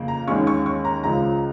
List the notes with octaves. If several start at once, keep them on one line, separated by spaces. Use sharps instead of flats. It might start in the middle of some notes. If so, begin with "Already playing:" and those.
Already playing: F2 C#3 A#3
A#5
D#2 D#3 G#3 C#4 C#6
C#6
C#6
A#5
C#2 C#3 F3 A#5